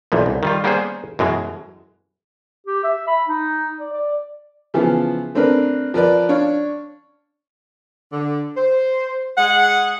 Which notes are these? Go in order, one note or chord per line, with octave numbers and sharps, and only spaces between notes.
B1 A#2 E3 F3
C2
D#3 G3 F4
G3 A#3 B3 C#4 G#4 C5
F#2 B2 E3 G#3
G4
E5
B5
D#4
D5
D5
C#3 E3 F3 B3
A3 C4 D4 A#4 B4
F3 A#4 B4 D5
D4 C#5 D5 F5
D3
C5
G#3 G#4 F#5